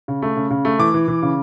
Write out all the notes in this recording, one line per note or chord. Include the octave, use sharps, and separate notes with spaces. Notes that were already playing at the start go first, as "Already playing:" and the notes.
C#3
A3
C#3
C#3
A3
E3 D6
E3
E3
C#3